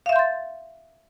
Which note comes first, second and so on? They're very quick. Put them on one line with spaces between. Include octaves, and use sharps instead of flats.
F5 E5 G6 C6 A6